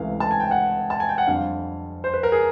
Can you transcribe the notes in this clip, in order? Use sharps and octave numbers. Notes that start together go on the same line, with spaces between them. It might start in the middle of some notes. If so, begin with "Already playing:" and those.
Already playing: C#2 C3 E3 A3 F5
A5
G#5
G5
F#5
A5
G#5
G5
F#5
F2 D3 G3 C4 F5
C5
B4
A#4
G#4